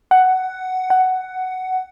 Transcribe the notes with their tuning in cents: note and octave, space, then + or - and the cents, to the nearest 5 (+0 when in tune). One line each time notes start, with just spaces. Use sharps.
F#5 +10
F#5 +10